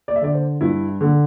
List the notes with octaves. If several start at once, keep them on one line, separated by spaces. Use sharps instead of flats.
D5
E5
D3 D5
C5
G2 E4
D3